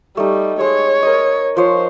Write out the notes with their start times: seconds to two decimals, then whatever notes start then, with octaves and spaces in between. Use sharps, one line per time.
0.17 G3 A3 D#4
0.61 G#3 C#5
1.03 A#4 D#5
1.57 F3 C5 C#5